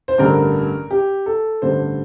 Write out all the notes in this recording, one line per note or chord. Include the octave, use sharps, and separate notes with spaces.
C5
A1 G2 D3 A#4
G4
A4
A1 G2 D3 A3 C5